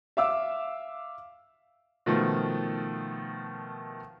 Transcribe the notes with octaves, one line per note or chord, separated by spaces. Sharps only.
E5 F5 D6 E6
B2 D#3 F3 A3 F4